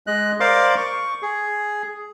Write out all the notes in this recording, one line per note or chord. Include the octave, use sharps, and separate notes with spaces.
G#3 D#5 F#6
A#4 C5 D5 F5 C6 D6
C#6
G#4